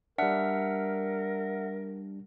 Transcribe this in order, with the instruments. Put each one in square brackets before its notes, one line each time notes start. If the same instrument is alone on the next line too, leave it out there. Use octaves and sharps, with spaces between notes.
[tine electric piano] G3 D4 [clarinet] A#4 [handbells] E5 F#5 F6